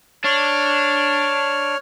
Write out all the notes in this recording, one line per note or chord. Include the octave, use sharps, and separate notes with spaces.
D4 C#5 F6